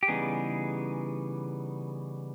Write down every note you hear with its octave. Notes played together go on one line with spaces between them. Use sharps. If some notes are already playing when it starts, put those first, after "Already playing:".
G4
C#3 E3 G3 B3 D#4 G#4